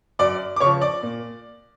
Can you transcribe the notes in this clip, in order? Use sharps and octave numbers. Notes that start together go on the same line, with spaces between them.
F#2 D5 D6
D6
C#3 C#5 C#6
F3
D5 D6
A#2